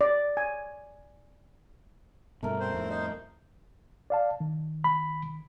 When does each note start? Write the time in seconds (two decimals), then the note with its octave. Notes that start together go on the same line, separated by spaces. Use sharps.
0.01 D5
0.37 G#5
2.43 G2 B2 A3 A#4
2.60 C4 C5
2.74 F2 A2
2.90 D#4 C5 D#5
4.10 D5 F5 A5
4.40 D#3
4.84 B5